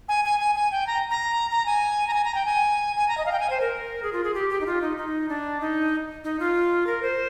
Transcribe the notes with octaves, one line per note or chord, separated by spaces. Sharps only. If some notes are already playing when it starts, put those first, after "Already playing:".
G#5
G#5
G#5
G#5
G5
A#5
A#5
A#5
G#5
A#5
G#5
A#5
G5
G#5
G#5
A#5
D#5
F5
G5
G#5
C5
A#4
G#4
F4
G#4
G4
G4
D#4
F4
D#4
D#4
D4
D#4
D#4
F4
A#4
C5